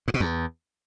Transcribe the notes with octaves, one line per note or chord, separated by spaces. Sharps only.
G#2
B2
E2